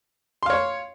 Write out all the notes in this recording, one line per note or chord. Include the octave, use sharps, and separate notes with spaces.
C#5 F5 C6